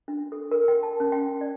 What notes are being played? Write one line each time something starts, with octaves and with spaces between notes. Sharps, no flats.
D4
A4
A#4
G5
A5
C#4
G5
D5